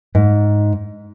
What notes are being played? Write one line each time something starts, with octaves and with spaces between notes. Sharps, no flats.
G#2